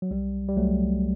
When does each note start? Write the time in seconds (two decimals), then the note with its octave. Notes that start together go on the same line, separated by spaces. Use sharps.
0.02 F#3
0.11 C2 G3
0.48 G3
0.57 C2 F#3 A3